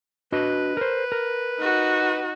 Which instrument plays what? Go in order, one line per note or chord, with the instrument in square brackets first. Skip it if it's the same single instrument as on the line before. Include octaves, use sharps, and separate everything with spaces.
[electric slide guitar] D4 F#4 D#5 [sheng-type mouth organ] B4
[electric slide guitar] A#4 C5
A#4
[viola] D#4 F#4